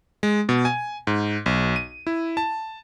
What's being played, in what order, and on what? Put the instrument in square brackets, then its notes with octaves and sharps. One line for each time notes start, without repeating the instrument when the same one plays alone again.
[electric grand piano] G#3
B2
G#5
G#2
B1
D#7
E4
A5